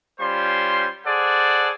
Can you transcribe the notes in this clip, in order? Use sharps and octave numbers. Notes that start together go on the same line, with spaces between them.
G3 C#4 F4 C5 C6
G#4 A4 C5 D5 F#5